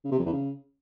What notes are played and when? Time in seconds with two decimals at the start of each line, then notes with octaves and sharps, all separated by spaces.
0.05 C#3
0.12 C3
0.19 F2
0.26 E2
0.33 C#3